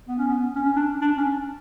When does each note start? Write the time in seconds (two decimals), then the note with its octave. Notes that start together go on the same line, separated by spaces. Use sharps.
0.08 B3
0.18 C#4
0.27 B3
0.56 C#4
0.66 C#4
0.76 D4
1.01 D4
1.17 C#4